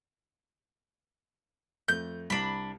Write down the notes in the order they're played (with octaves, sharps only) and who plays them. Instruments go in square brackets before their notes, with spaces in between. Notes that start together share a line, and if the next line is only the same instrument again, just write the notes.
[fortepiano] F2 A3 [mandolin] G6
[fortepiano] C2 [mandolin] D4 B5